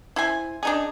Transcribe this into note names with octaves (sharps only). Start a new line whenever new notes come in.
E4 C5 G#5
D4 D#4 G#4